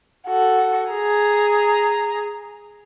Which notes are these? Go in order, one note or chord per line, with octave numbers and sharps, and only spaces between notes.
F#4 A4
G#4 A#5